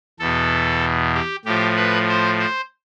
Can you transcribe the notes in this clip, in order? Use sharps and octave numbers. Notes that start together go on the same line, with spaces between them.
E2 B2 A4
G4
A2 F3 G4
B4
C5
C5